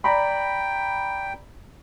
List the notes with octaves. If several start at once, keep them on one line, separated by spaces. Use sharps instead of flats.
D5 G5 A#5 B5